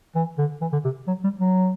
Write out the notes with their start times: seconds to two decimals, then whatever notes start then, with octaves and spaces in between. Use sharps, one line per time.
0.15 E3
0.38 D3
0.61 E3
0.73 D3
0.85 C3
1.07 F#3
1.24 G3
1.39 F#3